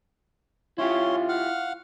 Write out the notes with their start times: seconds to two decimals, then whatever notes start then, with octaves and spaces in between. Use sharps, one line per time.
0.78 C#4 E4 F4 G4 C#5 C6
1.29 F5 F#5 F6